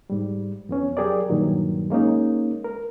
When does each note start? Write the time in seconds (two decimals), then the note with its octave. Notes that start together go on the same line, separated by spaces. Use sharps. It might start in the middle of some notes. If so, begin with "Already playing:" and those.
0.10 G#2 G3
0.69 F2 B3 C#4
0.97 F#3 G4 G#4 A#4 D5
1.29 G2 A#2 D#3 F#3
1.90 G#3 A#3 C#4 D#4
2.64 A#4